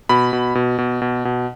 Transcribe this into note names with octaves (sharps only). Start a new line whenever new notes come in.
B2 B5
B2
B2
B2
B2
B2